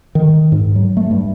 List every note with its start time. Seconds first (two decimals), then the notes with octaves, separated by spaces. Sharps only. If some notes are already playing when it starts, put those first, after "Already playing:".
0.15 D#3
0.52 G#2
0.76 F#3
0.97 A3
1.11 G2